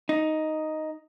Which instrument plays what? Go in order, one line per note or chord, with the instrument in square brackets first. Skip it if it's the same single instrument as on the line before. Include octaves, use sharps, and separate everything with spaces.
[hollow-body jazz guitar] D#4